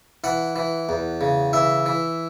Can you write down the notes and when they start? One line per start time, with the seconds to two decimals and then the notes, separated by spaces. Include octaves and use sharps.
0.24 E3 F#5
0.56 E3
0.89 E2
1.21 C#3
1.53 E3 E5
1.86 E3